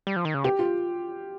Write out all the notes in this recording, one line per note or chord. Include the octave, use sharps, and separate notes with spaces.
G3
F3
D#3
C#3
C3 G4
F4